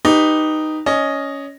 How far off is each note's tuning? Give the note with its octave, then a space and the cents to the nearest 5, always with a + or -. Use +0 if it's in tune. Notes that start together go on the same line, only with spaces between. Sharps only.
D#4 -5 G4 +10 B4 +0
C#4 +10 D#5 -5